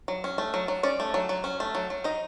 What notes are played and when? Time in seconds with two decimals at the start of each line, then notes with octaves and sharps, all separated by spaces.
0.08 F#3
0.24 C#4
0.38 A3
0.54 F#3
0.68 F#3
0.83 C#4 D5
1.00 A3
1.14 F#3
1.29 F#3
1.44 C#4
1.60 A3
1.75 F#3
1.90 F#3
2.04 D#4 D#5